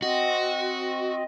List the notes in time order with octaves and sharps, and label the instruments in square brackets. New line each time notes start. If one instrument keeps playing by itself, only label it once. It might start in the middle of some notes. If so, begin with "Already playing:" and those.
[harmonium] C4 D#5 [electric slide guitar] F#4